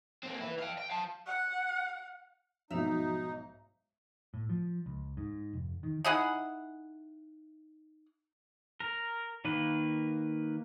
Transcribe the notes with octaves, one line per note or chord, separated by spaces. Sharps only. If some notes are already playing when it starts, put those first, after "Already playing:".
A#3 C4
E4 B4
F5 G5
G5
F5 A5
F#5
B1 G#2 F3 D#4 F#4 E5 F7
A2
F3
C#2
G#2
F1
D#3
D#4 E4 G#4 F#5
A#4
D#3 A#3 B4